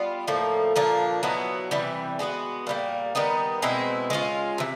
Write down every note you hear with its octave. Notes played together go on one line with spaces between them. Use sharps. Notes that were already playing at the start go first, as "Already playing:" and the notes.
Already playing: G3 B3 F4
A2 F3 A#3
A#2 F3 A#3 D4
B2 F#3 B3 E4
C3 E3 G3
G#3 B3 D4 F#4
A#2 G3 A#3
D#3 G3 B3 D#4
B2 G#3 C4 E4
G#3 C#4 F4
C3 E3